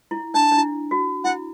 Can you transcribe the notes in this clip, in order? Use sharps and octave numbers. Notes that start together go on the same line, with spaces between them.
E4
D4 A5
D4
E4
F#4
E4 F#5